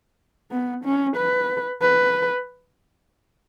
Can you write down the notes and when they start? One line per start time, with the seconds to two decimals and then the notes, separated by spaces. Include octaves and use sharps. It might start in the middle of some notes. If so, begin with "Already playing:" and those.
0.51 B3
0.85 C#4
1.16 B4
1.82 B4